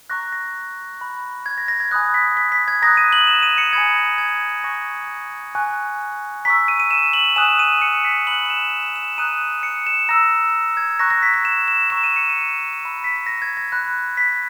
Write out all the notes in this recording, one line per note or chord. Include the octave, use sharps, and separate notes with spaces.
A#5 C#6 F#6 A#6
A#6
B5 F#6
G#6
A#6
A#6
G#6
G#5 B5 D#6 F#6 A#6
B6
B6
B6
G#6
A#5 D#6 F#6 A#6
D#7
F#7
E7
D#7
C#7
G#5 B5 D#6 G#6
A#6
G#6
G#5 C#6 F#6 A#6
G#5 C#6 F#6
A#5 C#6 E6 B6
D#7
D#7
E7
F#7
G#5 D#6 F#6 E7
D#7
C#7
B6
B5 F#6 F#7
E7
E7
A#5 D#6 F#6 D#7
C#7
E7
A#5 E6 A#6
G#6
A#5 C#6 F#6 A#6
A#6
B6
A#6
E7
E7
A#5 C#6 E6 E7
D#7
C#7
D#7
B5 E6
B6
A#6
G#6
A#6
B5 F#6
B6